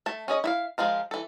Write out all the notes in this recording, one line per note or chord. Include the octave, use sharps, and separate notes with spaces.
A3 A5
C#4 G#4 D#5
E4 E5 F5
F3 G#3 F4 A#4
E3 A4